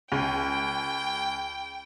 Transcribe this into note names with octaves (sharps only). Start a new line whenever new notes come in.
C#2 G5